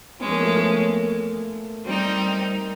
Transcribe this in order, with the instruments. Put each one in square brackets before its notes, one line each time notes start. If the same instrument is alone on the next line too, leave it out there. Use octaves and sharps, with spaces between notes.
[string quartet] F3 G#3 C#4 [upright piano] B3
[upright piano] A#3
A3
A#3
[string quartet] G3 C4 D#4